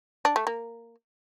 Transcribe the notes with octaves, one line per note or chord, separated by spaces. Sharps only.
D4
A3
A#3